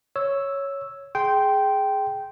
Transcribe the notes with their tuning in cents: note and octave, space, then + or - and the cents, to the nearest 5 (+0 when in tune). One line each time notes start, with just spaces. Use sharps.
C#5 +0 E6 +0
G#4 +10 G5 -10 C6 +0